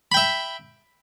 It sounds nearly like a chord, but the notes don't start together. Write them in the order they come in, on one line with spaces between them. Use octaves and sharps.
B5 G5 E5